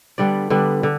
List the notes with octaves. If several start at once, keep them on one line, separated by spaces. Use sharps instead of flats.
D3 G3 B3 D4 D5
D3 G3 B3 D4
D3